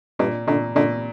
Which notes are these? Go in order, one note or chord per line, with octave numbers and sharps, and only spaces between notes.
G2 A#2
A#2 D3
A#2 D3